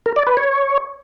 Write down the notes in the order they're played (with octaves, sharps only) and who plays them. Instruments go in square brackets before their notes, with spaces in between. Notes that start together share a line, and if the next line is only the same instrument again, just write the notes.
[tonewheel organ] A#4
D5
B4
C#5